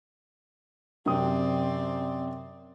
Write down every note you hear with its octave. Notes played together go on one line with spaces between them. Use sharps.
F#2 C3 C4 D5 D#6